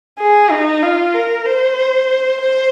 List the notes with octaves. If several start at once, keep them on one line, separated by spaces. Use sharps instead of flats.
G#4
D#4
F4
A#4
C5
C5